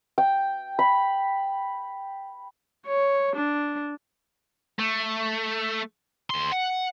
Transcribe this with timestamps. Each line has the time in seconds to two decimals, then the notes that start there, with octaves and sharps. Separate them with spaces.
0.18 G5
0.79 B5
2.87 C#5
3.36 D4
4.79 A3
6.30 D2 C6
6.52 F#5